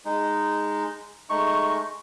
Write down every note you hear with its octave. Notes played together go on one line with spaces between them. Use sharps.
G#3 D#4
G#3 A3 D#4 C#6